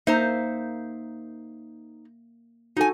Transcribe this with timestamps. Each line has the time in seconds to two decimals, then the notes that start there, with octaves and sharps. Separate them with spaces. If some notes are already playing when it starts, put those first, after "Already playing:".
0.07 A#3 D#4 C5 E5 A#5
2.77 D#4 F#4 A4 G#5